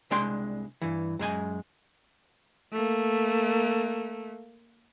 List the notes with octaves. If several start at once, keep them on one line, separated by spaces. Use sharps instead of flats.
C2 G#3 D4 G5 C6
G2 E3
F#2 G#3 G#5
A3 A#3